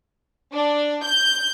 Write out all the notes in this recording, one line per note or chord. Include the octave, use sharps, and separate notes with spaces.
D4
G6